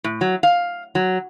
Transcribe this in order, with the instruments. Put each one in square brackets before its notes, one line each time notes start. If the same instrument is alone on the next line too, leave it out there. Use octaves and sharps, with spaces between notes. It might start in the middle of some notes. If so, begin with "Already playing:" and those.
[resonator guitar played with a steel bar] A2
F#3
F5
F#3